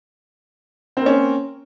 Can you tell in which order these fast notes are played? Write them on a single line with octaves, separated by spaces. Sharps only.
C4 A#3 C#4